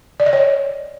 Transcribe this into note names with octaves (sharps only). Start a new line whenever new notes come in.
D5
D#5
C#5